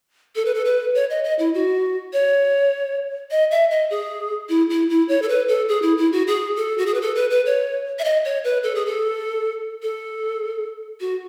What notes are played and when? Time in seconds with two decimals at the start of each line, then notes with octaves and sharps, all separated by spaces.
0.36 A4
0.45 B4
0.54 A4
0.65 B4
0.95 C#5
1.10 D#5
1.24 D#5
1.39 E4
1.54 F#4
2.13 C#5
3.31 D#5
3.51 E5
3.71 D#5
3.90 G#4
4.49 E4
4.70 E4
4.89 E4
5.09 C#5
5.22 A4
5.29 B4
5.48 A4
5.69 G#4
5.82 E4
5.98 E4
6.12 F#4
6.27 G#4
6.56 A4
6.78 F#4
6.86 G#4
6.94 B4
7.01 A4
7.16 B4
7.30 B4
7.46 C#5
7.99 E5
8.04 D#5
8.25 C#5
8.44 B4
8.63 A4
8.75 G#4
8.86 A4
9.82 A4
11.00 F#4